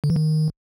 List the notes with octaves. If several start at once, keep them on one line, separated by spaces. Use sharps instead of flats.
D3
E3
D#3